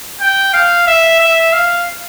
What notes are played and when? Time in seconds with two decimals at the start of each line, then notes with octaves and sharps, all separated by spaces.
0.21 G5
0.54 F5
0.87 E5
1.20 E5
1.53 F5